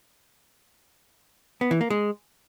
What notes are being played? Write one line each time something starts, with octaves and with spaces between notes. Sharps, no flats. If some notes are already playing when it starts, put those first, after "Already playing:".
B3
E3
A#3
G#3